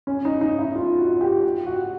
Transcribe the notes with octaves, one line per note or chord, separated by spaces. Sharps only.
C#4
D#4
D#4
E4
F4
F#4
G4
F#4